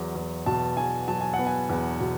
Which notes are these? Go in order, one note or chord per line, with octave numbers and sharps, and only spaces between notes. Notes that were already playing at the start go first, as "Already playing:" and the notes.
Already playing: E2 F#3
E2
B2 A5
E2 G#5
F#3 A5
G#5
F#5
B3
G#5
E2
B2